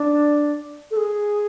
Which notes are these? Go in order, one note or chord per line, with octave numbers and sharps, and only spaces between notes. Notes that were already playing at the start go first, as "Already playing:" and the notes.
Already playing: D4
A4
G#4